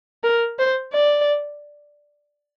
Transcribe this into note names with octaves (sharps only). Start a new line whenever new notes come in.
A#4
C5
D5